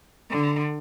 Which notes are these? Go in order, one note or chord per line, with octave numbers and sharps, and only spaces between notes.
D3